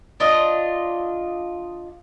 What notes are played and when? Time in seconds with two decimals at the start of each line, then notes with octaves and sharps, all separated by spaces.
0.20 D4 F4 D#5